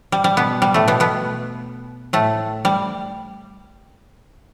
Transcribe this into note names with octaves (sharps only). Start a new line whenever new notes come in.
G3
G3
B2 B3
G3
A2 A3
B2 B3
B2 B3
A2 A3
G3